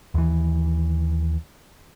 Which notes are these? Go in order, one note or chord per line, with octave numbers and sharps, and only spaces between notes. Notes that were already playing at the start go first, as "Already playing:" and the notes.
D#2 E3